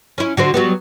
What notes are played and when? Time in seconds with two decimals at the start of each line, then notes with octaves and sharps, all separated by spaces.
0.18 C#4 E4
0.37 D3 F#4 C5
0.54 F#3 G3 B3